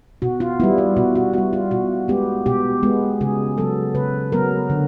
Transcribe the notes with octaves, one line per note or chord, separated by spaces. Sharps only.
B2 F#4
F4
G3 B3 E4
F4
B2 F#4
F#4
G3 B3 F#4
F4
B2 F#4
G#3 B3 G4
B2 G4
G#3 B3
C#3 G#4
F#3 B3 A4
C#3 B4
F#3 B3 A#4
D3